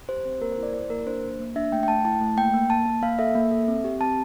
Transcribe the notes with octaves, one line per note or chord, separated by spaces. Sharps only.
G4 C5
C4 C5
A#3 A#4
C5
E4 D5
E4 D5
A#3 A#4
D4 C5
A#3
A#3
D4 E5
A3 G5
G5
A3 A5
E4 A5
A3
A#3 G5
A#3
A#3 A5
A#3
A#3 F5
A4 E5
A#3
A4
C4
G4
C4 A5